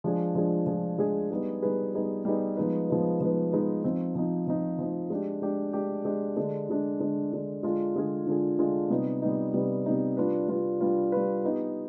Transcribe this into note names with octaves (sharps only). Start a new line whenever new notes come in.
F3 G#3 D4 G#4
F3 G#3 D4 G#4
F3 G#3 D4 G#4
F3 G#3 D4 G#4
G3 B3 D#4 G#4 B4
G3 B3 D#4 G#4 B4
G3 B3 D#4 G#4 B4
G3 B3 D#4 G#4 B4
F3 G#3 B3 D#4 B4
F3 G#3 B3 D#4 B4
F3 G#3 B3 D#4 B4
F3 G#3 B3 D#4 B4
F3 C4 D#4
F3 C4 D#4
F3 C4 D#4
F3 C4 D#4
G#3 D4 G4
G#3 D4 G4
G#3 D4 G4
G#3 D4 G4
D3 G#3 D4
D3 G#3 D4
D3 G#3 D4
D3 G#3 D4
D3 G#3 D4 F4 G#4
D3 G#3 D4 F4 G#4
D3 G#3 D4 F4 G#4
D3 G#3 D4 F4 G#4
C3 G3 B3 D#4
C3 G3 B3 D#4
C3 G3 B3 D#4
C3 G3 B3 D#4
G3 D4 F4 B4
G3 D4 F4 B4
G3 D4 F4 B4
G3 D4 F4 B4
B3 D#4 G4